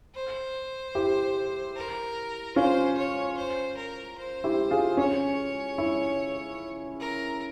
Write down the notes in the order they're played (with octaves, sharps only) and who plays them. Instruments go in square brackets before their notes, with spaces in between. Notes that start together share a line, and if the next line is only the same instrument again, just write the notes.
[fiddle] C5
[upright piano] E4 G4
[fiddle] A#4
[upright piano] C#4 F4 [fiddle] C5
[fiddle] C#5
C5
A#4
C5
[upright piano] E4 G4
F4 G#4
[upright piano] C#4 [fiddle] C#5
[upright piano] E4
[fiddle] A#4